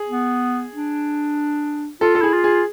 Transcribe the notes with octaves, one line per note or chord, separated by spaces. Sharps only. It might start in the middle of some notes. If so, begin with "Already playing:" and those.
Already playing: G#4
B3
D4
F4 A4
A4
E4 G#4
F4
G#4